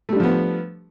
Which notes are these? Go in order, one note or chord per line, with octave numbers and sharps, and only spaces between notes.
F3 G3 A3 B3 D4